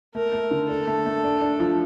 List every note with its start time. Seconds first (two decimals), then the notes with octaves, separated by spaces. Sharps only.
0.15 A3 A#4
0.33 A3
0.51 D3
0.69 D4 A4
0.87 A3
1.06 A3
1.24 D4
1.41 D4
1.60 F3